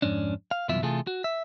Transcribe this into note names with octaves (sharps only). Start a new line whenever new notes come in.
F2 G#2 C#4 D4
F5
C2 F#2 B2 E3 F4 E5
C3 E3 A3 F4 G#4 A4
F#4
E5